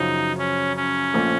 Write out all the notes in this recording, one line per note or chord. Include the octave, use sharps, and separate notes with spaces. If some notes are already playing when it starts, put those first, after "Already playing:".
Already playing: F#2 C#3 F3 D#4
C#4
C#4
A#1 A#2 F3 A3